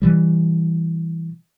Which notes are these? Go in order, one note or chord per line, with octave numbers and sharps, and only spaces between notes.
B2 E3 G3